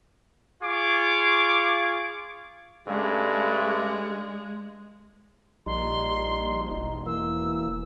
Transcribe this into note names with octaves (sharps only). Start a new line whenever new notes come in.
F4 G#4 C#6 D6
G2 C#3 G#3 A3
A#1 G3 D#4 C6
E1 D#4
E3 A#3 E6